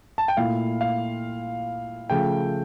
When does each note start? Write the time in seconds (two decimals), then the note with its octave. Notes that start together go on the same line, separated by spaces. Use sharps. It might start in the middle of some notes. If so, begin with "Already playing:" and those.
0.18 A5
0.28 G5
0.37 A#2 A3 E4 F5
0.81 F5
2.10 C#3 F3 A3 G5